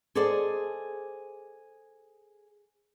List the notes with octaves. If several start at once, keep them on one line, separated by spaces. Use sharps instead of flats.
G#4 A4 C5 D5 D#5 G#5